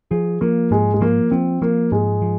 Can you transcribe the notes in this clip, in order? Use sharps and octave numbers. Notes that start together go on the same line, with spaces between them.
F3 G#4
F3 A#3
G#2 G#3
G#3
F3 A#3
F3 C4
F3 A#3
G#2 G#3
F3